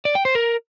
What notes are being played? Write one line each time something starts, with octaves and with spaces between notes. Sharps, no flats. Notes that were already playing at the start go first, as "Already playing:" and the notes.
D5
G5
C5
A#4